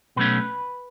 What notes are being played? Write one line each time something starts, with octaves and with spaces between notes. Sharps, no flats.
B2 F#3 A3 C#4 B4